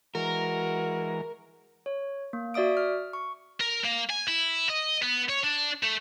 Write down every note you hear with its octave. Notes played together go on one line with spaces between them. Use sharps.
E3 G#3 F#4 A#4 A#5
C#5
A#3
F#4 D5 E5 D#6 D7
F6
C#6
A#4
A#3
G#5
E4
D#5
B3
C#5
D4
A3